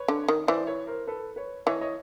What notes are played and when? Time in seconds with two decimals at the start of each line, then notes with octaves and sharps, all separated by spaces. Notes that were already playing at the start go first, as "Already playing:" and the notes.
Already playing: B4 C#5
0.08 D3
0.28 D#3
0.47 E3 C5 D5
0.67 B4 C#5
0.87 A#4 C5
1.07 A4 B4
1.36 B4 C#5
1.66 E3 C#5 D#5
1.81 C#5 D#5